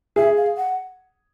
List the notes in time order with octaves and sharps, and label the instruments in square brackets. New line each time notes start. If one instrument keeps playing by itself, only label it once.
[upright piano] G#4 [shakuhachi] E5
[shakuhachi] F5
F#5